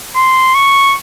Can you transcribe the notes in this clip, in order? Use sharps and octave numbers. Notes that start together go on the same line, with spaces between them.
C6
C#6